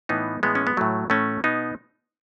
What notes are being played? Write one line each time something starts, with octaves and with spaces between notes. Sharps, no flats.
A2 E3 B3 D#4
A2 E3 G#3 B3
C#4
B3
A2 E3 F#3 A3
A2 E3 A3 C#4
B2 B3 D#4